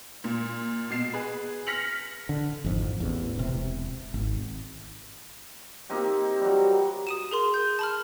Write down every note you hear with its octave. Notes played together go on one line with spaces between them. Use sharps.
A#2
B2 C7 E7
G#4 B4
F6 A#6 B6 C#7 F7 F#7
D3
G#1 F2
A1 E2
E1 C3
G#1
A#3 C4 D#4 G4
F#3 G3
D#6 D#7 E7
G#4 A#4 C6
G6
A5 B5 F6